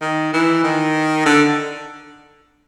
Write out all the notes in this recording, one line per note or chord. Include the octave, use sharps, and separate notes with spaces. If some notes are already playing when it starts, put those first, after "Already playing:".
D#3
E3
D#3
D3